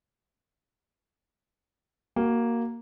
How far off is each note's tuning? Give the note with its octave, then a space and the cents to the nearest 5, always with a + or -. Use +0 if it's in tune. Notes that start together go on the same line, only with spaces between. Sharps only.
A#3 +0 F#4 +20